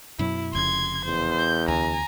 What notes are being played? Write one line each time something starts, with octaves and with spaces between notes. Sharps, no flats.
F#2 B2 F#3 E4
F1 F2 C#3 C6 G#6
E2 C5
G6
D2 G#5 A#5